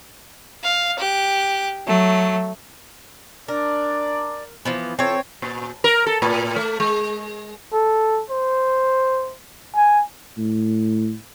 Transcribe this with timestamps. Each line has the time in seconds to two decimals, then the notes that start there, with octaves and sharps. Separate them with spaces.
0.62 F5
0.97 G4 F#6
1.86 F#3 A3
3.48 D4 A#4 D5
4.65 E3 F3 B3
4.99 E3 C4 F4 A4 C#5
5.42 A#2
5.84 A#4
6.07 A4
6.22 A2
6.56 A3
6.80 G#3
7.73 A4
8.30 C5
9.76 G#5
10.38 A2